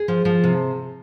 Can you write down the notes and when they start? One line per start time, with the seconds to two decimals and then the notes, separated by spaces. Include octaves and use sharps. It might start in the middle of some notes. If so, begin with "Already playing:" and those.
Already playing: G#4
0.08 F3
0.25 F3
0.44 C3